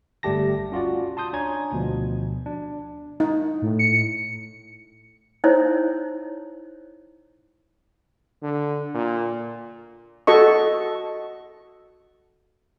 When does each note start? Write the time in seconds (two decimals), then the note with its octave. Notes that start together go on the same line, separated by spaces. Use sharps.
0.23 G1 G3 A3 G4 A5 A#6
0.72 C#4 F4 F#4 D5
1.17 A5 C6 D#6 G6
1.33 D4 C#5 G#5 A#5 G#6
1.72 D2 B2 F3
2.46 D4
3.20 D#4
3.62 A2
3.79 C#7
5.44 D#4 E4 C5 C#5
8.42 D3
8.94 A#2
10.27 F#4 A4 D#5 C#6